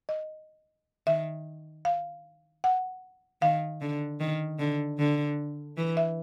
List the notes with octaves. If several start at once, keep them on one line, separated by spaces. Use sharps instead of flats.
D#5
D#3 E5
F5
F#5
D#3 F5
D3
D#3
D3
D3
E3
E5